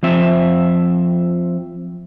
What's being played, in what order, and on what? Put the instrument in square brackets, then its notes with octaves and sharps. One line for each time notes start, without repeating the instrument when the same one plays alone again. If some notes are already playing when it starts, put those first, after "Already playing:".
[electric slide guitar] F3 C4 E5